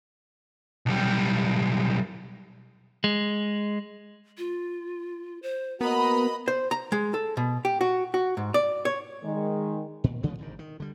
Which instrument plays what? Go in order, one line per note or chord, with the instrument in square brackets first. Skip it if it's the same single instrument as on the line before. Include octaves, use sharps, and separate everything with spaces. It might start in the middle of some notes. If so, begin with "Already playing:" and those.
[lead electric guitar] B1 G3
[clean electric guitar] G#3
[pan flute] F4
C5
[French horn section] A#3 F#4 A#4 [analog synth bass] B3 [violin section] D#5 B5 [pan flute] A#5
[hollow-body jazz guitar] C5
A#5
G#3
A4
B2
G4
F#4
F#4
G#2
D5
C#5
[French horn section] D#3 G#3
[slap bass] A#2
C3 F3 A3 B3
G#1 G#2 D#3
D#3
D3 G3